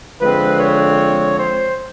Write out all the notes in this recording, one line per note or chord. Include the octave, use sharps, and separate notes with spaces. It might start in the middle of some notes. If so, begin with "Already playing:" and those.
D3 F3 G#3 C4 B4
C#5
C5